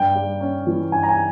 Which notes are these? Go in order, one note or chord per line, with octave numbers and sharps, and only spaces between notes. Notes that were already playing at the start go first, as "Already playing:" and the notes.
Already playing: G2 G5
G3
C#4
E3
G2 G#5
A#5
G#5
G3